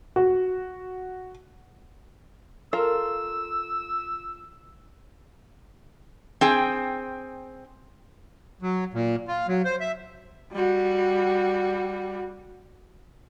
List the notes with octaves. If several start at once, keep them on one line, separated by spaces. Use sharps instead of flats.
F#4
F4 A4 A#4 E6
C4 G#4 G5
F#3
A#2
F4
F#3
C5
E5
G3 F#4